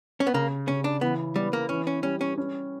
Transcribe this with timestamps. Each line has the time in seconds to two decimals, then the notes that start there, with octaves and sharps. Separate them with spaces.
0.20 C#4
0.27 B3
0.34 C#3 A#3
0.68 C#3 C#4
0.84 D4
1.01 E3 B3
1.36 G3 B3
1.53 A#3
1.69 E3 C#4
1.87 C#4
2.03 G3 C#4
2.21 C#4
2.38 C#4